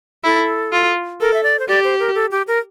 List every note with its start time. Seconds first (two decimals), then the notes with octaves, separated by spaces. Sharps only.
0.24 E4 A4
0.73 F4
1.20 A4 A#4
1.34 E5
1.43 D5
1.59 C5
1.68 G4 D5
1.84 C5
1.99 A#4
2.15 A4
2.31 G4
2.47 A#4